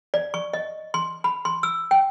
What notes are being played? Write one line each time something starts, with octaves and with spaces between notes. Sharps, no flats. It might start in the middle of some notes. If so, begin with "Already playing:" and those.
D5
C#6
D#5
C6
B5
C6
E6
G5